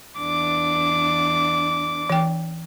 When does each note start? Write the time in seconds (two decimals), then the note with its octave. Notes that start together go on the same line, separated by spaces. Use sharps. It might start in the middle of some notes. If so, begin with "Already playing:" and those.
0.18 E2 D4 D6
2.10 E3 G5